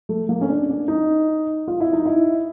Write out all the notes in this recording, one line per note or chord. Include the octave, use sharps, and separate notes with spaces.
A3
A#3
C#4
D4
D4
D#4
F4
E4
D#4
E4